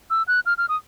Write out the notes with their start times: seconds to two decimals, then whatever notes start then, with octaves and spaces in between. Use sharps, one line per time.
0.10 E6
0.28 F#6
0.46 F6
0.58 F6
0.69 D#6